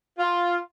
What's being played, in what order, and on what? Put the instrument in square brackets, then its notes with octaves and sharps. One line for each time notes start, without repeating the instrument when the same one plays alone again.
[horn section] F4